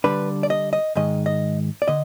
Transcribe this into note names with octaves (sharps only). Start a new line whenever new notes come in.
D3 G3 D4 B4
D5
D#5
D#5
G#2 D#3 G#3 D#5
D#5
D5
D3 D#5